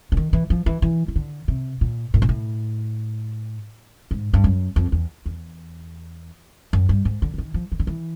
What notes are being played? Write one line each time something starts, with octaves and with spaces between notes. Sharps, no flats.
D3
D#3
E3
F3
E3
E3
D#3
D3
C3
A#2
A2
A#2
A2
G#2
G2
F#2
F2
E2
E2
F#2
G2
G#2
D3
D3
D#3
F3
E3
D#3
E3